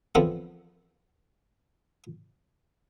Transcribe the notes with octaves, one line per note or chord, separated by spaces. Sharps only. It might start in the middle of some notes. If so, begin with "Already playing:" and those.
D3 E3 F3 B3 C4 A4